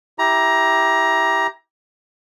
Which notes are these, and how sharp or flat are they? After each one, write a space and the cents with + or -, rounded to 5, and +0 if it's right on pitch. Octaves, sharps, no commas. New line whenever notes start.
E4 +0 G4 +0 A#5 +20